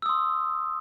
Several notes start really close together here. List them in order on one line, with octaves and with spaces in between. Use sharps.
E6 D#6 C6